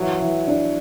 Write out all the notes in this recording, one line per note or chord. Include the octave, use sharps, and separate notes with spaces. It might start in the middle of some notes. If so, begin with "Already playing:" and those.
Already playing: E3 F#3
E3
D4